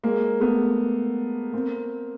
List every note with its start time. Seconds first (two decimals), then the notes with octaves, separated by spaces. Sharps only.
0.03 G#3 A#3
0.41 A3 B3
1.53 A#3 C4